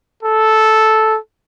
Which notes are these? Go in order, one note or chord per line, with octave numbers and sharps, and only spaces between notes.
A4